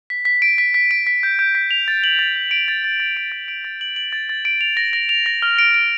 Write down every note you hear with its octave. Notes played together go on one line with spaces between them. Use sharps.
B6
B6
D7
B6
B6
D7
B6
G6
G6
B6
F7
A6
F#7
A6
A6
D7
A6
A6
A6
D7
A6
D7
A6
F#7
F#7
A6
A6
D7
F7
A#6
A#6
F7
A#6
F6
D7
D7